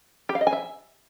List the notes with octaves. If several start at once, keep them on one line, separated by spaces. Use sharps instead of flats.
G4
F5
D#5
G#5
E5